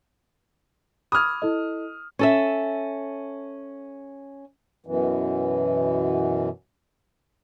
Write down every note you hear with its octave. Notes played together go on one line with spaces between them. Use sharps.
B5 D6 D#6 F6 G#6
E4 A4 D#5
C#4 A4 E5
F#2 B2 E3